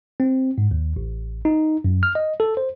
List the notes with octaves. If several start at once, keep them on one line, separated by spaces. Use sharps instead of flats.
C4
G#2
D#2
A1
D#4
F#2
F6
D#5
A4
C5